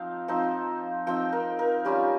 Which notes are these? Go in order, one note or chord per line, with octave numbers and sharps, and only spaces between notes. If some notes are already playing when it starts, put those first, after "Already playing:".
Already playing: F3 C4 D#4 F5 G5
F3 C4 D#4
F3 C4 D#4 G5
A#4
A#4
G3 C#4 F4 G4